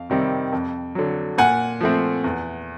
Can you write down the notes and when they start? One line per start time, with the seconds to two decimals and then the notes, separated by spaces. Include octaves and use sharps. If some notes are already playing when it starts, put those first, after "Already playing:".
Already playing: F2 F5
0.10 C3 D#3 G3 C4
0.53 F2
0.95 D3 F#3
1.38 A#2 F#5 G#5
1.81 F3 A3 C4
2.24 E2